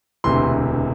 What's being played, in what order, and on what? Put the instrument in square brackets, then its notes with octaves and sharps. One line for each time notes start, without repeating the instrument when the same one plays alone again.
[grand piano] E1 D2 C3 E3 C6